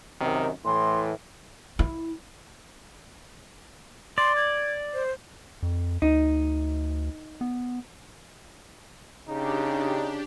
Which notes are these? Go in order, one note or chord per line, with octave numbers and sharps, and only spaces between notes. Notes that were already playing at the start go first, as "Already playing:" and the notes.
F#2 C3 D#3
A2 E3 C6
E4
D5 C6
G#6
C5
F2
D2 D#4
B3
C#3 D4 D#4 G4